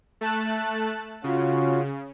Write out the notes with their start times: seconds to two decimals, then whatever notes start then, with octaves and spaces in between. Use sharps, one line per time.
0.21 A3 A5 F#6
1.24 C#3 C#4 F4 F#4